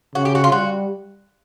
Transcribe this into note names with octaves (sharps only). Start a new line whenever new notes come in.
C#3 F#4
G4
F#4
F4
G3 F#4